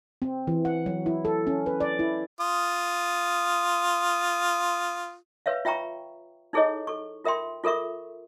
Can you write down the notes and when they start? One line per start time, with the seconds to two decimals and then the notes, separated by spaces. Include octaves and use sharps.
0.22 C4
0.47 E3
0.65 F#5
0.86 F#3
1.06 E4
1.25 A4
1.47 C#4
1.66 B4
1.80 D5
1.99 E4
2.40 F4 D#6
5.46 B4 C#5 E5 F5
5.65 F4 E5 G5 A#5 C#6
6.53 D#4 E4 G#4 A4 C#5 D#5
6.87 A4 C#6
7.24 F4 A#4 E5 G5 C6
7.64 F4 A4 A#4 E5 C#6